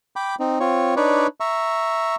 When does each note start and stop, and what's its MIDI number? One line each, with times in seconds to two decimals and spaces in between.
0.16 0.35 79
0.16 0.35 83
0.16 0.35 86
0.40 0.59 60
0.40 0.59 63
0.60 0.94 60
0.60 0.94 65
0.60 0.94 73
0.97 1.27 62
0.97 1.27 63
0.97 1.27 71
0.97 1.27 73
0.97 1.27 74
1.40 2.16 76
1.40 2.16 82
1.40 2.16 85